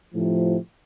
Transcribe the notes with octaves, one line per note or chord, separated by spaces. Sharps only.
A2 C3 F3